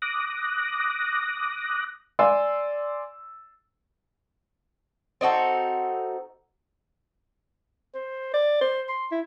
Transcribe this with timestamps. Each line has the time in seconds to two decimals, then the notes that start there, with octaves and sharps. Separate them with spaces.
0.02 D6 D#6 F#6 A#6
2.19 D5 G#5 C6 E6
5.21 C4 D#4 F#4 A4
7.94 C5
8.34 D5
8.61 C5
8.89 C6
9.12 E4